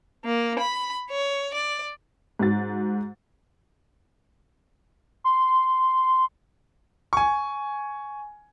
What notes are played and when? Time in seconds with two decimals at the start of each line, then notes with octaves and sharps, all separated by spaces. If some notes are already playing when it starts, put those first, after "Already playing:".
0.23 A#3
0.58 B5
1.09 C#5
1.54 D5
2.39 G#2 F#4 A6
5.24 C6
7.13 G#5 C#6